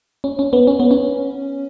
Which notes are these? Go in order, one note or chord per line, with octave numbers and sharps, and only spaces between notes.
C#4
C#4
B3
C#4
B3
C#4